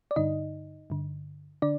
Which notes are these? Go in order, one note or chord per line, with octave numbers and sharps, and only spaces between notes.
D5
G2 D3 D#4 D#5
G2 D3
D3 D4 D5